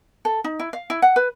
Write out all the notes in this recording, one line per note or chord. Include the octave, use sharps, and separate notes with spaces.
A4
D#4
E4
F5
E4
F#5
B4